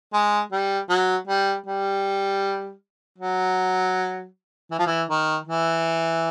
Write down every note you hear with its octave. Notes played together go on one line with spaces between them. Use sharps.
G#3
G3
F#3
G3
G3
F#3
E3
F3
E3
D#3
E3